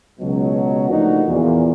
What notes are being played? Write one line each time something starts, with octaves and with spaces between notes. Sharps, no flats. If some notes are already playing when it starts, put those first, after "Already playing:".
C#2 B2 F#3
F3 A3 A#3 D4 D#4 F#4
E2 A#2